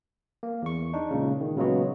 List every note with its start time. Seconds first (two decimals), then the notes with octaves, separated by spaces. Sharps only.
0.43 A#3
0.62 E2 C#6
0.93 D4 D#4
1.11 C#2 A#2 C#3
1.41 D#3
1.56 A#2 C#3 F#3 G#3 B3 F#4